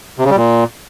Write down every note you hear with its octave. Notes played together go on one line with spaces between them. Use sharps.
C3
C#3
G3
A#2